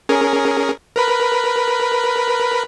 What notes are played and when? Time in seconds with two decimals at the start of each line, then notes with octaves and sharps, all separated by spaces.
0.09 C#4 G#4 A#4
0.96 A#4 B4 B5